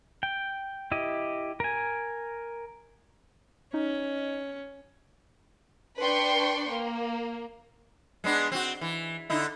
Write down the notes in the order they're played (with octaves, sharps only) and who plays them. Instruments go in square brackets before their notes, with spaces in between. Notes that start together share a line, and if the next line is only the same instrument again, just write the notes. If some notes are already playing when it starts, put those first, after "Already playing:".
[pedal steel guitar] G5
E4 G4 D#5
A#4 G#5
[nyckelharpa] C#4 [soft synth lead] D#4
[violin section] D4 B4 G5 C6 C#6
A#3
[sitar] G#3 B3 D4
C4 F#4
E3
D3 D#4 E4